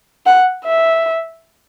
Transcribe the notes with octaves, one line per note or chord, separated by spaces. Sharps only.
F#5
E5